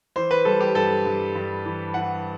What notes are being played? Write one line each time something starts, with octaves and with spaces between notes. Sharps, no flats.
E3 C5
B4
G3 A4
G4
G2 A4
G2
G2
E3
E3 F#5